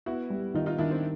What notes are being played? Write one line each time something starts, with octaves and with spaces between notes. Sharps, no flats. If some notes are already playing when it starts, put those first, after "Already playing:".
B3 E4 F#4
G3
D#3 D#4 F4
D#4 F4
D#3 D4 E4
C4